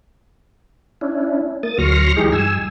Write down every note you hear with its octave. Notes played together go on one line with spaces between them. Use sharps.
C#4 D4 E4
A#3 D#6 A6
D2 F#3 C6 C#6 F6 A#6
E3 G#3 D#4 G4 G#4
G2 G#5 E6